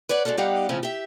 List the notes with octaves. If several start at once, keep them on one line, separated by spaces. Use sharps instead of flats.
B4 C#5 D5 F#5
G#3 A#3 D4 F#4 A4
G3 B3 D#4 G4 F5 F#5
A2 C#3 F3 C4 C#4
G4 E5